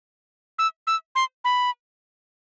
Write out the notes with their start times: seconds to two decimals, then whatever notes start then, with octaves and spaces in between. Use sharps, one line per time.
0.59 E6
0.87 E6
1.15 C6
1.44 B5